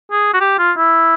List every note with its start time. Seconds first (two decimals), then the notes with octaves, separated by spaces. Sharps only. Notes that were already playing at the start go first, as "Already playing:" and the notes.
0.12 G#4
0.34 F#4
0.41 G4
0.59 F4
0.77 E4